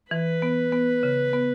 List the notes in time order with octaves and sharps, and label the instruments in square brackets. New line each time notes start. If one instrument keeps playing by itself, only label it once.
[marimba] E3 [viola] B4
[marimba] B3
B3
C#3
B3